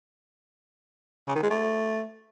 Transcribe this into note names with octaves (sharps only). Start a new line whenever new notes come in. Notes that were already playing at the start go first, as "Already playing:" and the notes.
C#3
D#3
G#3
A3